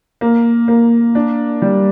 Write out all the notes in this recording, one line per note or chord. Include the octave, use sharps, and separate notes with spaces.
A#3
A#3
D4
G3